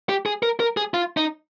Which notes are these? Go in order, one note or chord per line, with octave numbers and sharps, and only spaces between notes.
G4
G#4
A#4
A#4
G#4
F4
D#4